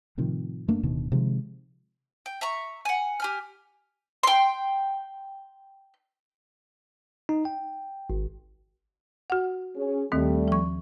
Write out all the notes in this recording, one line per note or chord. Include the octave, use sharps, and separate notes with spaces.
A2 C3 D#3 F3
F#2 A3 A#3 D4
D1 B2 D3 D#3
C3 D#3 F3 G#3
G5
E5 A#5 C#6
F#5 G#5
G4 G#5 F6
G5 C6
D#4
G5
G#1
F#4 F#5
C#4 G#4
D#2 D#3 G3 A3 C4
F3 C#6